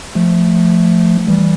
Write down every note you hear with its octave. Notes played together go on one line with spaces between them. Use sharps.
F3 A3
E3 G3